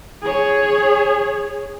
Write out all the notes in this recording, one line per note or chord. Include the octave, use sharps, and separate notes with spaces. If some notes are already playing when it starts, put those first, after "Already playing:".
G#4 C#5